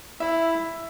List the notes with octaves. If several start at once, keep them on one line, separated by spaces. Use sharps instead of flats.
E4 E5